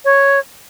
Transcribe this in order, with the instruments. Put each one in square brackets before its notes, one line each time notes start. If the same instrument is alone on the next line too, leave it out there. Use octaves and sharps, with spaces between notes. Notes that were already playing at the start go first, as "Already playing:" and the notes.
[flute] C#5